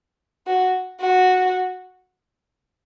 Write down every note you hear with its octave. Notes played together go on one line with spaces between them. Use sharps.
F#4
F#4